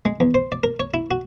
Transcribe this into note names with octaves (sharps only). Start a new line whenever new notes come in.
G#3
E2
C5
D5
A#4
C#5
E4
F#4